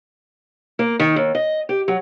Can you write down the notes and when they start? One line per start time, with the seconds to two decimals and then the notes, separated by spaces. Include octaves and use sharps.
0.79 A#3
1.00 D#3
1.16 D#2
1.35 D#5
1.69 G4
1.88 F#3